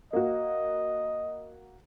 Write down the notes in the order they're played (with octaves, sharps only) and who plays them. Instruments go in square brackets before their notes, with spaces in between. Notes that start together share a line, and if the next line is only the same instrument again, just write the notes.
[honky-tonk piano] A#3 F#4 [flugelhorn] D#5